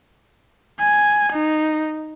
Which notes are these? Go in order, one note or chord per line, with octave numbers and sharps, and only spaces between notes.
G#5
D#4